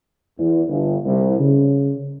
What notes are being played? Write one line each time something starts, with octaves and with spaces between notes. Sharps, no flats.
E2
G1
C2
C#3